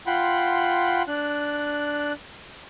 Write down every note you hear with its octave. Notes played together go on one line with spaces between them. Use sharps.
F4 F#5 G5 B5 C6
D4 F#6